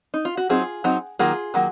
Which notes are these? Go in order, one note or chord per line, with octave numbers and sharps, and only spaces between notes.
D#4
F4
F#4
F#3 C4 D#4 F4 G#4
F#3 C4 D#4
D#3 F#3 A#3 F4 G#4
D#3 F#3 A#3